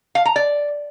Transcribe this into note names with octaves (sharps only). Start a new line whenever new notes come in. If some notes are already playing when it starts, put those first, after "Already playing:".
F5
A#5
D5